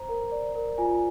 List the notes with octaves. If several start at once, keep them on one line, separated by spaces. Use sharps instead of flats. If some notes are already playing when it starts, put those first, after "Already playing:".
Already playing: C5 A#5
A#4
D5
A#4
F4 G#5